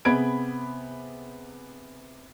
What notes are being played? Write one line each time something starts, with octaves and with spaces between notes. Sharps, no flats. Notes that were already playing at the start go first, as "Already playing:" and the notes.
C3 B3 G#4 B5 G#6 D7